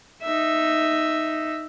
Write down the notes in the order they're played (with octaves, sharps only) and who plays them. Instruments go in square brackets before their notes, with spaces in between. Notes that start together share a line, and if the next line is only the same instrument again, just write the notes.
[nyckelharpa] D#4 E5